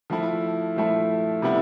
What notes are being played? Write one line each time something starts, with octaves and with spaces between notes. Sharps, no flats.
F3 A3 E4
F3 A3 E4
C3 G3 B3 E4